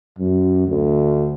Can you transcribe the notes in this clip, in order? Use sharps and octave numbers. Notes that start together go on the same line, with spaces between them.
F#2
D2